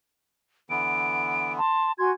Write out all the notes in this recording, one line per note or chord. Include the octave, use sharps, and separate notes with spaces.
D3 E3 B3 D7
A5 C6
F#4 G#5 C6 G#6